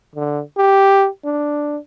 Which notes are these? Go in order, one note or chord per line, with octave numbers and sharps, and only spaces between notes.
D3
G4
D4